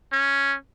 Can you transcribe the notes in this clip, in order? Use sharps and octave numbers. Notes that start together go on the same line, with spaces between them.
C#4